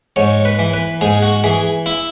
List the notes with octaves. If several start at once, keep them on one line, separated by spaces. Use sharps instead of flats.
G#2 C#5
B4
E3
B4
G#2 G#4
F#4
E3 G#4
E4